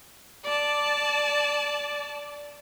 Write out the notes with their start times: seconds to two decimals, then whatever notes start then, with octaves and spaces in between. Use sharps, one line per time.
0.44 D5 A5